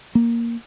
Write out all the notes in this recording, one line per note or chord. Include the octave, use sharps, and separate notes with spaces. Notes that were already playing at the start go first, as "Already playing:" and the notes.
A#3